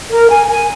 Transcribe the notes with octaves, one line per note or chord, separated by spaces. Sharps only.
A#4
G#5
G#5